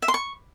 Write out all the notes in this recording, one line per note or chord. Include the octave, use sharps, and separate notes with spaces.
E5
C6
C#6